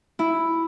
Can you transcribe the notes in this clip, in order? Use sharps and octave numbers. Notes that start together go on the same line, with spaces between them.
E4